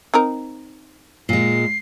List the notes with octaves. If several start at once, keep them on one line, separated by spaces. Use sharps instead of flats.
C4 D#4 A#4
A#2 G#3 C7